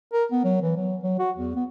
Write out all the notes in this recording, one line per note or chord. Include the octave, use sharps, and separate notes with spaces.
A#4
B3
F#3
E3
F#3
F#3
F#4
E2
B3